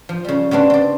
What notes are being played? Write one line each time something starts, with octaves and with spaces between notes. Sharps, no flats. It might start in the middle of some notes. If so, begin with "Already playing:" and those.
F3
C#3 G3
C#3 B3 C4 D4
C4 D5